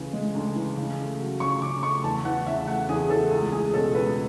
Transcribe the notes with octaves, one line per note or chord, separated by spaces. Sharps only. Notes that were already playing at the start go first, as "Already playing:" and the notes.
Already playing: D2 C#3 E3
G#3
D2
E3
C#3
A3
F#3
C#3 C#6
C#3 D6
A3 C#6
E2 A5
E3 F#5
C#3 E5
A3 F#5
E2 G#4
E3 A4
C#2
A3 G#4
B2 A4
C#2 B4